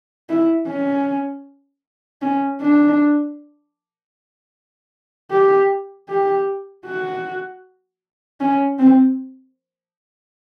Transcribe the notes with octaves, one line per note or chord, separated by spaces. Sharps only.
E4
C#4
C#4
D4
G4
G4
F#4
C#4
C4